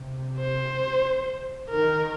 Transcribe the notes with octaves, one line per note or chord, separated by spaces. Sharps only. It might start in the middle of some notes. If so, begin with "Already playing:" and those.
Already playing: C3
C5
D#3 A#4